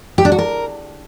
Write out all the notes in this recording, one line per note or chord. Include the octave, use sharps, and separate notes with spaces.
G4
D4
F#4
A#4